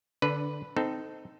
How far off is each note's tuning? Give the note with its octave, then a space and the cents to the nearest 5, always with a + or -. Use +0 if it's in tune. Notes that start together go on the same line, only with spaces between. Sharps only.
D3 +0 D4 -25 B4 +0
C4 -20 D#4 +0 A4 +5